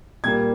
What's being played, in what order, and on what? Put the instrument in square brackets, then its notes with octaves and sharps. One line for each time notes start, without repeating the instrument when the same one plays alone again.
[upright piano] A#2 G3 A#3 G#6